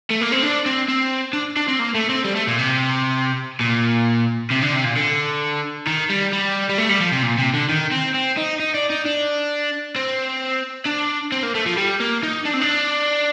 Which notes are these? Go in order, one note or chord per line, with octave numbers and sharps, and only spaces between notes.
A3
A#3
C4
D4
C4
C4
D4
D4
C4
A#3
A3
C4
G3
A3
A#2
C3
A#2
C3
D3
C3
A#2
D3
D#3
G3
G3
G3
A3
G3
F3
C3
A#2
C3
D3
D#3
C4
C4
D#4
D#4
D4
D#4
D4
C4
D4
C4
A#3
A3
F3
G3
A#3
D#4
D4
C4
D4